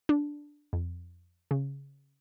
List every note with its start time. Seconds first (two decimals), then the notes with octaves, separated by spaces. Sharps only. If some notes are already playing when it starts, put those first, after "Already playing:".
0.09 D4
0.73 F2
1.51 C#3